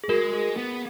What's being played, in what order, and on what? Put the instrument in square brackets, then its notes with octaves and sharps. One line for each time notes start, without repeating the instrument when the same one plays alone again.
[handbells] G#4
[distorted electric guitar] G#3 [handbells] F#4 A#4
[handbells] G#4
[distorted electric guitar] B3